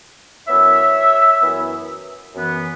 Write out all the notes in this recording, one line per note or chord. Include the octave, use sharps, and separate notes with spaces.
F#2 E3 B3 C#5 E5
F#2 E3 B3
F#2 E3 B3